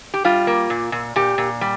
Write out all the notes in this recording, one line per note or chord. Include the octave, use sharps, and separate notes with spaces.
G4
G3 F4
A#3
A#2
A#2
A#2 G4
A#2
G3